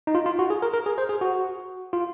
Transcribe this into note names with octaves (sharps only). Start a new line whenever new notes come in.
D#4
F4
F4
F#4
G#4
A#4
A#4
G#4
C5
G#4
F#4
F4